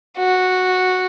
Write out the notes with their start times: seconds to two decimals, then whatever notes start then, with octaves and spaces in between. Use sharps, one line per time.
0.18 F#4